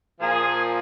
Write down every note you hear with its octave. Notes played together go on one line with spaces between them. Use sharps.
A#2 F3 G#4